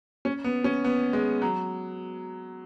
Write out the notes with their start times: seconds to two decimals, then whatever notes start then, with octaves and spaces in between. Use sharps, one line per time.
0.25 C#4
0.44 B3
0.64 C#4
0.84 B3
1.13 G#3
1.42 F#3